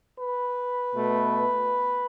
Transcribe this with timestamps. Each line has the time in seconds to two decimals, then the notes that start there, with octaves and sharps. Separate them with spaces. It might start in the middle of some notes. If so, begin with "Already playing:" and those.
0.19 B4
0.93 B2 A3